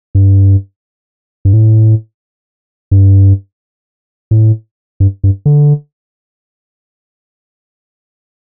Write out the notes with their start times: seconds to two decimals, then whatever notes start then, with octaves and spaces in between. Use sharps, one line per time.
0.15 G2
1.45 G2
1.53 A2
2.91 G2
4.31 A2
5.00 G2
5.24 G2
5.46 D3